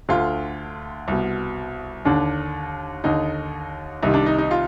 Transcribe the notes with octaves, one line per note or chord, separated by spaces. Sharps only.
D2 D3 F4
C2 B2
D#2 D3 D4
D#2 D3 D#4
C2 C3 D#3 D#4
D4
D#4
D#4
F4